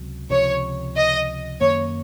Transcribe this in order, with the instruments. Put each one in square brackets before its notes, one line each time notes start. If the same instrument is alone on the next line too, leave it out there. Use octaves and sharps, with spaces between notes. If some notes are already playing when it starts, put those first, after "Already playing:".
Already playing: [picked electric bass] C#2 C3 F#3
[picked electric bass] C#2 C3 F3 [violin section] C#5
[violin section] D#5
[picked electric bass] F#2 D#3 F#3 A#3 [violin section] C#5